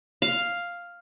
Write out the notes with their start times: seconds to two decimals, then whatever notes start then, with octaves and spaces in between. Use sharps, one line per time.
0.22 F5